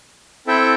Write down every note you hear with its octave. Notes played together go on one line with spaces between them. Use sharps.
C4 E4 A4 E5 G5